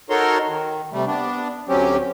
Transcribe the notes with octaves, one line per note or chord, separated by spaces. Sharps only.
D#4 F#4 A4 A#4 C#5 C6
D#3
C3 G3 A3
B3 D4
D2 F#3 C4 C#4 G4